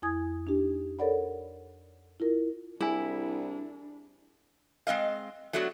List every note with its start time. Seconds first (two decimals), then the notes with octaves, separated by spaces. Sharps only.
0.02 F2 E4 G#5 D#6 G#6
0.47 D4 D#4 G4
0.99 A4 A#4 C#5 D5 F#5 B5
2.20 E4 F4 A#4
2.81 C2 D4 E4 G#4 G#5
4.87 G#3 C4 D#5 F5
5.53 F#3 A3 B3 D4 F#4